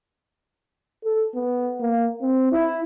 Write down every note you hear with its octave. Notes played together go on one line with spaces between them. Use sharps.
A4
B3
A#3
C4
E4